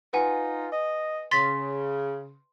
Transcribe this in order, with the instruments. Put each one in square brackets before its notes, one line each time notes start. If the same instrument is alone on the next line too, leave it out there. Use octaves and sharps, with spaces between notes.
[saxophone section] D#4 F4 [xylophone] B4 F#5 G#5
[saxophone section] D#5
[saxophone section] C#3 [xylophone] C6 A6 B6